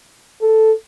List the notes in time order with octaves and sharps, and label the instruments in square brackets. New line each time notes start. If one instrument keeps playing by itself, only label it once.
[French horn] A4